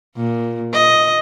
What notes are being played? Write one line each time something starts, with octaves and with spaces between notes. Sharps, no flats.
A#2
D#5